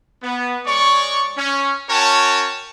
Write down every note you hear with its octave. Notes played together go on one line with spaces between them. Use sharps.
B3
G#3 C#5 D5 C#6
C#4
C#4 F#4 A#4 C#5 G5 A5